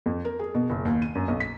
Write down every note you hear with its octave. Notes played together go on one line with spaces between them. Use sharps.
F2
A#4
G#4
B2
F#1
D#2
D#7
F#2
B1
B6